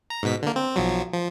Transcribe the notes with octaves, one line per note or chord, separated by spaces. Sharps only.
A#5
G#2 B2 B6
D3 A#3
C4
B1 F3 F#3
F3